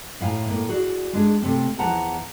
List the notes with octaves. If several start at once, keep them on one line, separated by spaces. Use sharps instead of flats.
A2 F5 F#5 G#5 A#5
A2 A#3
F#4 G#4 D5
G#3 D4 G#4
C3 A3 C4
E2 E3 F3 F#5 A5 A#5